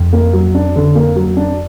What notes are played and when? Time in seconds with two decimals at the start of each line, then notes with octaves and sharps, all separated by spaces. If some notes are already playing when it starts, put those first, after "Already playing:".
Already playing: F2
0.13 A#3
0.33 F#3
0.55 D4
0.76 D3
0.95 A#3
1.16 F#3
1.37 D4